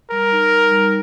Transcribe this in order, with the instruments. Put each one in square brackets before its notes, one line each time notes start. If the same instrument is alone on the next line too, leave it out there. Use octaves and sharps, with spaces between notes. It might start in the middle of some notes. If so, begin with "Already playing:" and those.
[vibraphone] G3 [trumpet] A#4
[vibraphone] D#4
G3
G3